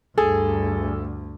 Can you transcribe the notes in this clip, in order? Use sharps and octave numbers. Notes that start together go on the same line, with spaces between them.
D2 G2 G#4 A4